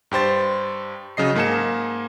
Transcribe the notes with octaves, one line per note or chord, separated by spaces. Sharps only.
G2 G4 C5 A6
C#3 F#3 D#5 C7
G#2 A#3 G#4 A5 C#7 E7